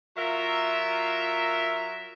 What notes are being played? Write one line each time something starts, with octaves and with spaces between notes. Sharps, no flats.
F#3 F4 A#4 E5